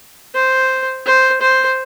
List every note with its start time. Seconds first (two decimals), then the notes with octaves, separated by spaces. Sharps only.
0.34 C5
1.06 C5
1.41 C5